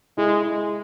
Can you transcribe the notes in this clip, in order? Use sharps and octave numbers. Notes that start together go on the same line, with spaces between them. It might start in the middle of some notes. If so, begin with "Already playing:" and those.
G#3 E4 G#4
G#3